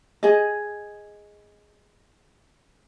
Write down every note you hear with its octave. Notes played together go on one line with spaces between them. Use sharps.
G#4 D#5